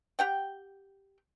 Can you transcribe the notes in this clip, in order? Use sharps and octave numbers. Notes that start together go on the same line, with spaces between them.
G4 F#5 G5